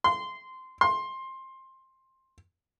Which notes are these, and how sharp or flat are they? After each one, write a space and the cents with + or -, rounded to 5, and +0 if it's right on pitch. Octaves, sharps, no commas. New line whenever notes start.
C6 -15
C6 +15